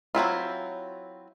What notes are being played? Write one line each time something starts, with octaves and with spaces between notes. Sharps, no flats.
F#3 C4 E4 F4